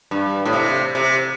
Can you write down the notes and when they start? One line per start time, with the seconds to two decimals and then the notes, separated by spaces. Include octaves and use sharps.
0.11 G2
0.45 A2
0.54 C3
0.95 C3